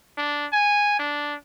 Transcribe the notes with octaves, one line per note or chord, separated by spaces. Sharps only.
D4
G#5
D4